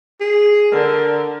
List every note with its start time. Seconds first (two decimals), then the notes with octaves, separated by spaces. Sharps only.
0.21 G#4
0.72 D3 A#4